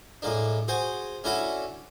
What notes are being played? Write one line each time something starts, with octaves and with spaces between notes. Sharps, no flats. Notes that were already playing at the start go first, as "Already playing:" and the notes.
A2 G#3 A#3 D4
F#4 G#4 C5
C#4 D4 E4 F#4 A4 F#5